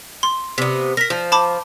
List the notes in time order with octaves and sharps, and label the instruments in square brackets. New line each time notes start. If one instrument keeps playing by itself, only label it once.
[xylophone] C6
[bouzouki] C3 B3
[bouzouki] A#4 [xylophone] A#6 B6
[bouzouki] F3
[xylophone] A5 B5 D6